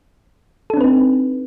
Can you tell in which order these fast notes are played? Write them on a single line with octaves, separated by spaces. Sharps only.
A4 D4 C4 B4 D#4